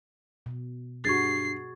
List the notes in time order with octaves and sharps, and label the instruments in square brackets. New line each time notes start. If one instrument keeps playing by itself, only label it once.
[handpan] B2
[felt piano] G2 [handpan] F#4 G#4 [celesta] C#6 G#6 A6 [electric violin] C7